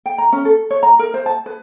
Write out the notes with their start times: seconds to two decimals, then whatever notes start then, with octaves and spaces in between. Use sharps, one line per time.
0.06 G5
0.18 A#5
0.33 C#4
0.45 A4
0.71 C#5
0.83 A#5
0.99 A#4
1.14 C5
1.26 A5
1.46 B4